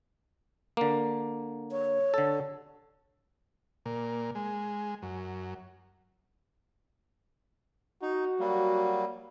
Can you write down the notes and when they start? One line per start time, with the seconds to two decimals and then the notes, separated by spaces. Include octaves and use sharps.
0.77 D3 A#3
1.71 C#5
2.14 D3 A4
3.86 A#2
4.35 G#3
5.02 F#2
8.02 D#4 F#4
8.40 F#3 G3 A#3